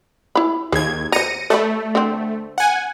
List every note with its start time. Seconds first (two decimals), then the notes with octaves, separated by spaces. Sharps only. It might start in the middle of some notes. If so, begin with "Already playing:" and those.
0.35 E4 B5
0.72 D#2 G#4 G#6
1.12 C5 A#5 A#6 C#7 D#7
1.50 A3 D5 D#5 B5
1.95 D3 C4
2.58 F#5 G#5